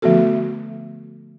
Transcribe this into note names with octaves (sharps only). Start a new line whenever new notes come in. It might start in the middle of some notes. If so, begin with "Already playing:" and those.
D3 F3 A3 B3 F#4 A4